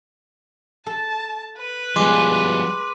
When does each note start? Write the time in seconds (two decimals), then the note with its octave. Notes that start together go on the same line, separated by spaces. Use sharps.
0.86 A4 A5
1.58 B4
1.96 F3 G3 G#3 B3 C6 D6